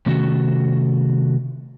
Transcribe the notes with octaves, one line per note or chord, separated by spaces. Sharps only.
C3 D#3 A3 C#4 F#4 A4